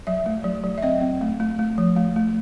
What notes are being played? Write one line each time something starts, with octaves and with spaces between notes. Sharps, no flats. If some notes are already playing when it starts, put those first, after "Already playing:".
F#3 E5
A3
F#3
F#3
E5
C4 D#5
C4
A3
A3
A3
F3
A3
A3